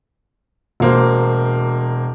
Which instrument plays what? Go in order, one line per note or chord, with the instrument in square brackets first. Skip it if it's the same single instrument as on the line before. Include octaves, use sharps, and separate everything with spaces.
[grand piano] E1 A#3 C5